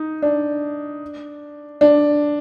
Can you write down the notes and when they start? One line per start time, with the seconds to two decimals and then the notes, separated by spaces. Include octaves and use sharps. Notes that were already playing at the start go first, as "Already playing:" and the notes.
Already playing: D#4
0.22 D4
1.81 D4